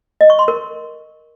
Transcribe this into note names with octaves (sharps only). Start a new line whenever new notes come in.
D#5
C#6
C6
A#4